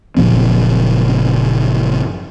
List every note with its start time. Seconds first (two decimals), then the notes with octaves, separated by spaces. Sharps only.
0.17 F#1 A#2 F3 C4